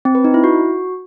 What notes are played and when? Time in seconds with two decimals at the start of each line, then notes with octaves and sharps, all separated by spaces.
0.05 C4
0.15 B4
0.24 D#4
0.34 E4
0.44 F#4